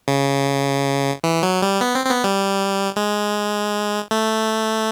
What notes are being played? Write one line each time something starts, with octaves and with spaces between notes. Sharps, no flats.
C#3
E3
F#3
G3
B3
C4
C4
B3
G3
G#3
A3